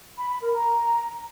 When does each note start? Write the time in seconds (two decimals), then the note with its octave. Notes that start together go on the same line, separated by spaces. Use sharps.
0.18 B5
0.30 B5
0.42 A#4
0.54 A#5